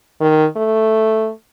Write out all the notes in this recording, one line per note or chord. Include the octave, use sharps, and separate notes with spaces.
D#3
A3